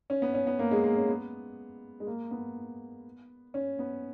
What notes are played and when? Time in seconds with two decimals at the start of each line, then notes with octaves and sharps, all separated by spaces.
0.10 C#4
0.22 B3
0.34 C#4
0.47 B3
0.59 A#3
0.71 G#3
0.84 A#3
0.96 C#4
1.08 B3
2.00 G#3
2.07 A#3
2.31 B3
3.54 C#4
3.79 B3